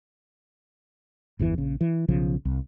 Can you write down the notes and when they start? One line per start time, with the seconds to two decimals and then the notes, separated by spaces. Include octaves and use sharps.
1.39 G1 E2 A#2 E3
1.58 A#1 C#3
1.81 E3
2.08 B1 C#3 F3
2.45 C2